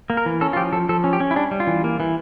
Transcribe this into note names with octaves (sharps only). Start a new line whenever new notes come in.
A#3
A#4
E3
C#4 A4
F4
F3 G4
F3 A4
F3 A4
C#4
G4
C#4
E4
G3 D4
G3
F4
E3
A#3
E3